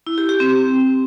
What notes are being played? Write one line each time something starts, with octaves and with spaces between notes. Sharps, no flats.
E4
G4
G4
C4